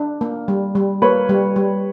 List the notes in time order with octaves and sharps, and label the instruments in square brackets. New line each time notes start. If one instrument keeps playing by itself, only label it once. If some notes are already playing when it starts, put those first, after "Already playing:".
Already playing: [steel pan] D4
A#3
G3
G3
[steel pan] A#3 [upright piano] B4 C#5
[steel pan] G3
G3